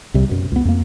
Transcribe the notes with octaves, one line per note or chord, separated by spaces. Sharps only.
C2 C3 G3
F#2 B2
C#2 B3
F2 A#3